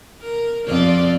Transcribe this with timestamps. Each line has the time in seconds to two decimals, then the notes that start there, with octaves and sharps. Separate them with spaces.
0.21 A#4
0.67 F2 F4 D5